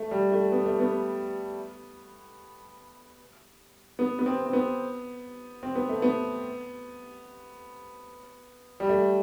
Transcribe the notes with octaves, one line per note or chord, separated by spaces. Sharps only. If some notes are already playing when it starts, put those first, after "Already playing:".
Already playing: A3
G3
A3
B3
A3
B3
B3
B3
C4
C4
B3
C4
B3
A3
B3
G3
A3